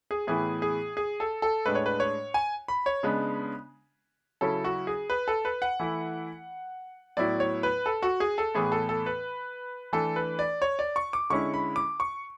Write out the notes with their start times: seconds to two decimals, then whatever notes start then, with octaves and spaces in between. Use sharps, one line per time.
0.11 G#4
0.27 A2 E3 B3 E4 G#4
0.62 G#4
0.97 G#4
1.20 A4
1.42 A4
1.66 A2 G#3 D4 B4
1.75 C#5
1.86 B4
2.00 C#5
2.34 G#5
2.68 B5
2.86 C#5
3.03 C#3 G#3 B3 D4
4.41 C#3 F#3 C#4 E4 A4
4.64 F#4
4.87 G#4
5.10 B4
5.28 A4
5.45 B4
5.62 F#5
5.79 E3 A3 E4
7.17 A2 F#3 B3 E4 D5
7.40 C#5
7.63 B4
7.86 A4
8.02 F#4
8.20 G#4
8.38 A4
8.55 A2 E3 B3 G#4
8.72 A4
8.89 A4
9.06 B4
9.93 E3 A3 D4 A4
10.16 B4
10.39 D5
10.62 C#5
10.79 D5
10.96 C#6
11.13 D6
11.30 D3 G#3 C#4 E4 C#6
11.54 B5
11.76 D6
12.00 C#6